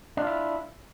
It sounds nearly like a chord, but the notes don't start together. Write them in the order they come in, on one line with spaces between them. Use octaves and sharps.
D4 F4 E4